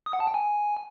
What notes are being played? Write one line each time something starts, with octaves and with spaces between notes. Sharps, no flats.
D#6
F#5
A5
G5
G#5